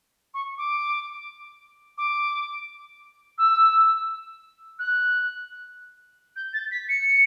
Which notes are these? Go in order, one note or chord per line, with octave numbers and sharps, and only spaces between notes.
C#6
D6
D6
E6
F#6
G6
A6
B6
C#7